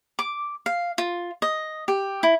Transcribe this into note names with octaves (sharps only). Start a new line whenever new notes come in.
D6
F5
F4
D#5
G4
E4